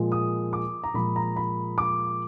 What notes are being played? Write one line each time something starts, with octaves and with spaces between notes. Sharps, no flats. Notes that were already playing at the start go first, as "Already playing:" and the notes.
Already playing: A#2 F3 G#3
D#6
D6
A#5
A#2 F3 G#3 B5
A#5
B5
D6